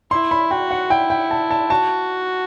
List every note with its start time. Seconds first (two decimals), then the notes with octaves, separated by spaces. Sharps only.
0.11 E4 C6
0.31 B5
0.51 F#4 G5
0.71 F#5
0.90 E4 G5
1.10 G5
1.31 A5
1.51 A5
1.70 F#4 A5